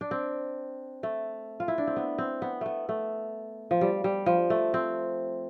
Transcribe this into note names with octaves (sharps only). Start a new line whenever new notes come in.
D4
C4
A3
F4
E4
D4
C4
B3
C4
B3
A3 B3
A3
F3
G3
G3
F3
A3
C4